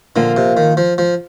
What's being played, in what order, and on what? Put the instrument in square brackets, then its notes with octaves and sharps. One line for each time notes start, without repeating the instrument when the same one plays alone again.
[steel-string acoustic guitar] A#2 F3 A#3 F4 [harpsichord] D3
[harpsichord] C3
D#3
F3
F3